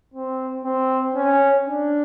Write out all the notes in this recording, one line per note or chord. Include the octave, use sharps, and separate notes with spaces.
C4
C4
C#4
D4